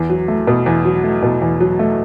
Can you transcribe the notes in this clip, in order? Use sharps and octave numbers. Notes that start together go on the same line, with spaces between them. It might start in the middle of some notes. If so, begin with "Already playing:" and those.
Already playing: E2
F#3
A3
B2
E2
F#3
A3
B2
E2
F#3
A3